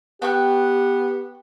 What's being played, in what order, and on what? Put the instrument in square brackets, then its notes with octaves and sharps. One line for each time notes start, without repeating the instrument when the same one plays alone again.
[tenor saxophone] B3 [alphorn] G4 [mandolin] G5 C#6 F#6